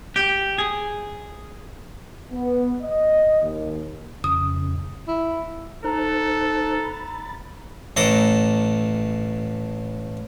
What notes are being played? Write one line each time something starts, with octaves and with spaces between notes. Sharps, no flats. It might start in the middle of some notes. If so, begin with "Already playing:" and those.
G4
G#4
B3
D#5
D#2
F2 C#3 D#6
E4
D#4 A4 C5 A#5 F#6
B5 A6
A1 A2 A4 A#5 D6